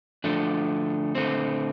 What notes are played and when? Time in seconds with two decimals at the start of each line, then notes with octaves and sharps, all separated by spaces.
0.24 D3 F3 A3 D4
1.15 D3 A3 C4